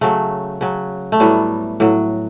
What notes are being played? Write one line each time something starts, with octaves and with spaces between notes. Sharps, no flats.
C#3 F#3 A3
C#3 F#3
A3
A2 F#3 G3 B3
A2 F#3